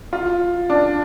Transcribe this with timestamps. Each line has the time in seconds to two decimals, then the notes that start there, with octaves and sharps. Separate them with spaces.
0.13 F4
0.70 D4